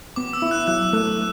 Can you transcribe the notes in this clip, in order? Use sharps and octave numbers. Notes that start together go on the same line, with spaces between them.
B3 D6
E6
E4
F#6
F#3 F#6
A3 F#6